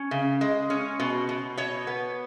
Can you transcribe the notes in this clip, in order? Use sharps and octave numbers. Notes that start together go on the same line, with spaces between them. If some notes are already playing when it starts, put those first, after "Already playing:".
Already playing: C#4
C#3
G#3
C#4
B2
B2
B2 C#5
B3